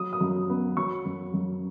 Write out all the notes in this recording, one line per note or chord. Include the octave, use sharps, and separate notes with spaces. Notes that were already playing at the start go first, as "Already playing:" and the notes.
Already playing: F#3 D#6
D#6
F#2
B3
F#3 C#6
F#2
F#2